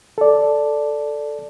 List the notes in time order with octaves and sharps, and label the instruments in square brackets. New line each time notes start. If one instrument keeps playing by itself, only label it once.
[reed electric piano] A4 D5